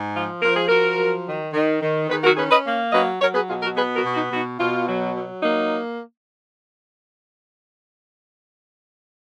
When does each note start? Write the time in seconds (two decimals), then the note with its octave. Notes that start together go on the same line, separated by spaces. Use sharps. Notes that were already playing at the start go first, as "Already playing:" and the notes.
Already playing: G#2
0.14 F3 F4
0.42 F3 A#4
0.55 G#4
0.68 F3 F#4 A#4
0.98 F#3
1.25 D#3
1.53 D#3
1.81 D#3
2.08 D#3 G#4 B4
2.23 F#4 A#4
2.36 C#4 G#4 B4
2.50 B4 D#5
2.64 A#3
2.92 F#3 B4 D#5
3.20 F#3 A#4 C#5
3.34 G#4 B4
3.48 B2 F4 G#4
3.62 F#4 A#4
3.75 B3 G#4 B4
3.95 F#4 A#4
4.03 B2
4.13 D#4 F#4
4.31 B2 D#4 F#4
4.59 B2 F4
4.87 F#3
5.15 F#3
5.43 A#3 D#4